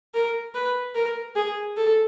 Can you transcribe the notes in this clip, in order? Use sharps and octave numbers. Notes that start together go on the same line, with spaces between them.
A#4
B4
A#4
G#4
A4